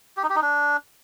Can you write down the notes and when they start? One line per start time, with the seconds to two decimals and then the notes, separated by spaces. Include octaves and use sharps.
0.17 G4
0.23 D#4
0.29 G4
0.36 D#4
0.42 D4